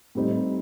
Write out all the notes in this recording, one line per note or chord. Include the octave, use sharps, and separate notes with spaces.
A2 G3 C4 D#4